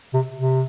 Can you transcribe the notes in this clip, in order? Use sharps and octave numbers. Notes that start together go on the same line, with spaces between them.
C3
C3